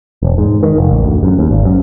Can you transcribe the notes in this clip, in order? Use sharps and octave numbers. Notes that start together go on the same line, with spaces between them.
E1
G#2
D#3
F1
A1
D2
F#2
D#2
G#1
F#2